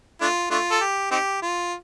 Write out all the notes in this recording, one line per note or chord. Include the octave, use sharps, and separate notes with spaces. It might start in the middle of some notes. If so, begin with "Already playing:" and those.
A3 D4 F4
A3 D4 F4
A4
G4
C4 D#4 G4
F4